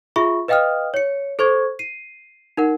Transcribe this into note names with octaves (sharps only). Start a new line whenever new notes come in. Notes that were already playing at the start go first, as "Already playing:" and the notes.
F4 G#4 E5 B5 C#6
B4 D#5 F5 G5 D#6 F6
C#5 C#7
A4 C5 C#6 G#6
C7 D#7
D#4 A#4 F#5